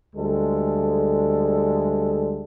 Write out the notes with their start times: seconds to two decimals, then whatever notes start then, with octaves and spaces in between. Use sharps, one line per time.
0.16 D2 G3 G#3 A4